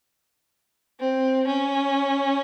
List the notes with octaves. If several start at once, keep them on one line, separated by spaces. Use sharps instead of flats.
C4
C#4